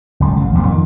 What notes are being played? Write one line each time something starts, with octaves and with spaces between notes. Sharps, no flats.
F#1 C#2 A2
A1 F#2 C#3
F1 A#1 E2 G2
F2 D#3